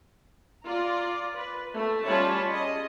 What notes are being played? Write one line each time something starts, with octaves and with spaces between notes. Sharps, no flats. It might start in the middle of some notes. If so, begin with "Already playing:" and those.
F4 D5 A#5
B4
A3
G3 C#4 F4 C#5 A5 B5
G#4 D#5